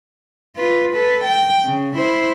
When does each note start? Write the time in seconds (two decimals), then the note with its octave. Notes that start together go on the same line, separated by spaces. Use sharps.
0.56 F4 B4
0.93 A4 B4
1.24 G5
1.65 C#3
1.96 E4 C5